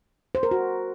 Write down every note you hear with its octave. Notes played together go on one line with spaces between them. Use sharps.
C5
A#4
F#4